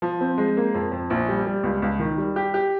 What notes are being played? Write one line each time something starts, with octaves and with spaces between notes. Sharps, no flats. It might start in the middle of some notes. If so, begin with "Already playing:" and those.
F3
C4
G#3
A#3
F2
F2
A#1
G3
G3
C#2
C#2
D#3
G3
G4
G4